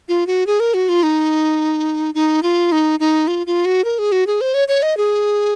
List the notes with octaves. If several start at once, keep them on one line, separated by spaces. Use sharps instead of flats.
F4
F#4
G#4
A#4
F#4
F4
D#4
D#4
F4
D#4
D#4
F4
F4
F#4
A#4
G#4
F#4
G#4
C5
C#5
C#5
D#5
G#4